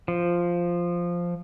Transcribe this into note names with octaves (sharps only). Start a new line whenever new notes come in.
F3